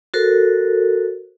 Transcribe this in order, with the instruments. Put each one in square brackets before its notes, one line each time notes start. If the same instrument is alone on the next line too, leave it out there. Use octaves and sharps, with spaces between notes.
[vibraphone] F#4 A4 A#4 C5